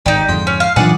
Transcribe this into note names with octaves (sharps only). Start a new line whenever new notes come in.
G#1 D#4 G4 D5
F2 G#2 D3 G5 C6
C#4
F5
B1 A#2 E3 F3 D4 G#4 D5 F#5